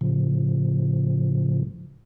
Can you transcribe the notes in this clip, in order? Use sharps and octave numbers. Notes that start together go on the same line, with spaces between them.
A2 C#3 F3